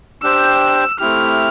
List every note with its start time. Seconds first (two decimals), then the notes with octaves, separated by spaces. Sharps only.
0.23 D4 G4 C5 G5 E6
1.00 A3 C4 E4 G4 F6